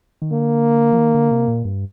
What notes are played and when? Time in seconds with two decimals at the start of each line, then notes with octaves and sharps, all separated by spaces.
0.22 D#3
0.31 D3 A#3
0.93 F3
0.98 D#3
1.15 D3
1.31 C3
1.48 A#2
1.65 G2